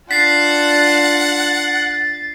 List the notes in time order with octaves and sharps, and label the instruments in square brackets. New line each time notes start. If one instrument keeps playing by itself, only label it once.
[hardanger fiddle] D4 F4 [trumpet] F#5 [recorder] A6 [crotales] B6 C7